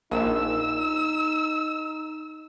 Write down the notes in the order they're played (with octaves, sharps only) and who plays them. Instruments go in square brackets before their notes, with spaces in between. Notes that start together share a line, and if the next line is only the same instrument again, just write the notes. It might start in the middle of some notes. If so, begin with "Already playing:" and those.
[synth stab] A#1 [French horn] D#4 [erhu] E6